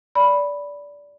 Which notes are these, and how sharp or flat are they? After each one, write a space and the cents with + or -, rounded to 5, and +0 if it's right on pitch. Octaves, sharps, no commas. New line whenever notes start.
D5 -20 B5 -5